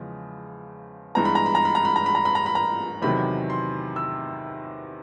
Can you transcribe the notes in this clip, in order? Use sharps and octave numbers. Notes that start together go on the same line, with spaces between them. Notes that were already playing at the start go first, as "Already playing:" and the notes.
Already playing: E2 C#3 F3 G#3
G2 E3 G#3 B3 A#5
B5
A#5
B5
A#5
B5
A#5
B5
A#5
B5
A#5
B5
A#5
B5
A#5
E2 C3 D#3 F#3 B5
C6
E6